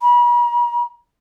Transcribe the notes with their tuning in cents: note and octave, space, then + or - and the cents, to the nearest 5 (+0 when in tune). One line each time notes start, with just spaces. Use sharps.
B5 -45